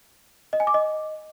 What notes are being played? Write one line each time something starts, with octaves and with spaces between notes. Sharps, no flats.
D#5
G#5
D6
D#5